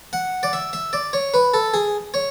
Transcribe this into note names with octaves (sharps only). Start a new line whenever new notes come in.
F#5
D5
E5
E5
D5
C#5
B4
A4
G#4
C#5